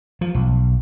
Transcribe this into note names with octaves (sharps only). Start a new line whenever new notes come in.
F3
B1